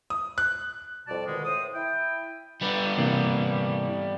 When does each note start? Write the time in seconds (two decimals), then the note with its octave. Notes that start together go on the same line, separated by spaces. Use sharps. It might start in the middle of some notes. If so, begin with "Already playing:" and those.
0.10 D#6
0.38 F#6
1.07 F2 B2 G3 D5 A5
1.27 B2 D3 D#3 G#3
1.45 A2 C5 D#6
1.74 E4 G5
2.61 G3 B3
2.98 C3 E3 A#3